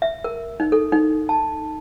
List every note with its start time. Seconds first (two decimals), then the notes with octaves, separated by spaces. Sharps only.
0.02 E5
0.24 A#4
0.60 D#4
0.72 A4
0.92 D#4
1.29 A5